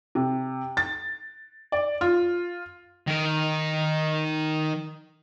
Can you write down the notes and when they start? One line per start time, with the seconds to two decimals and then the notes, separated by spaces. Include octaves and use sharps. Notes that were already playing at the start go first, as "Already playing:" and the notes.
0.15 C3
0.77 A6
1.72 D5
2.01 F4
3.08 D#3 A#4